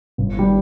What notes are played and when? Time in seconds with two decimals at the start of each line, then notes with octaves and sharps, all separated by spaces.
0.18 G1
0.37 D#3 G3